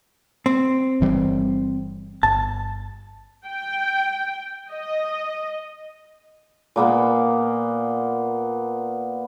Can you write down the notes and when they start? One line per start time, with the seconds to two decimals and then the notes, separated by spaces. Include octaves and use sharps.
0.46 C4
1.01 G1 E3 G3
2.23 G1 A5
3.46 G5
4.70 D#5
6.76 A#2 A#3 B3